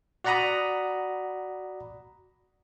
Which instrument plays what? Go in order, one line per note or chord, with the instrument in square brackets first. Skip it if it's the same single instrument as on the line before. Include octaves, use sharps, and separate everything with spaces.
[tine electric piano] F#4 D5 F#5 A#5 B5 D#6